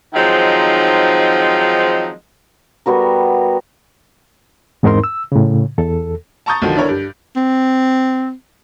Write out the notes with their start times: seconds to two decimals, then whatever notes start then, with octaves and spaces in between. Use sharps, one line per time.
0.14 D#3 F3 F#3 G#3 C4 D#4
2.86 G3 B3 F#4 A#4
4.83 E2 G#2 C4 D#4 A#4 C6
5.04 E6
5.32 A2 C#3
5.77 E2 A4
6.46 A5 A#5 C#6 D#6 G6 A6
6.62 B1 D3 D#3 F3 F#3
6.75 D3 D4 E4 A#4 C#5
6.89 G2
7.37 C4